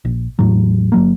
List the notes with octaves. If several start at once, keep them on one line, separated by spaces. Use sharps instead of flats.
A#1
E2 A2 E3 F#3
G1 F#3 A#3